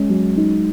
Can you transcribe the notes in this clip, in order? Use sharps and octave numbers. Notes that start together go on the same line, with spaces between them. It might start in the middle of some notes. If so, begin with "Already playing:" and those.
Already playing: G#3 C#4
F#3
D#4